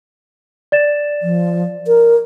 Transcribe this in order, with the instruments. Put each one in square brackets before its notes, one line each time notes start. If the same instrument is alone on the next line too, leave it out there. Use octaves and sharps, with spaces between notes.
[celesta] D5 A6 E7
[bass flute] F3
A#4